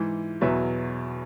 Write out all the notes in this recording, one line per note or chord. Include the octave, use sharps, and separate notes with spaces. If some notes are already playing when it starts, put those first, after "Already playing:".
Already playing: G#2 E3
E2 B2 F#3 B4 E5